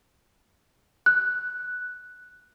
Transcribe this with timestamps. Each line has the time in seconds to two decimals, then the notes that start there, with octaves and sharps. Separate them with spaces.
1.06 F#6